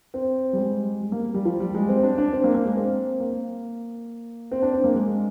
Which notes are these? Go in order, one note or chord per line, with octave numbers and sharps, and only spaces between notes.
C4
G3
G#3
G3
A#3
G3
F3
G3
G#3
C4
D4
D4
C4
A#3
A#3
G#3
C4
A#3
C4
D4
C4
A#3
G#3